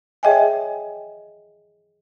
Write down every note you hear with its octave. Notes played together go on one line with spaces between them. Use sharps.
G#4 C#5 D#5 E5 G5 G#5